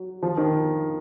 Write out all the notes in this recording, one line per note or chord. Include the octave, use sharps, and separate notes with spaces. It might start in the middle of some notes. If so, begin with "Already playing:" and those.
Already playing: F#3
F3
D#3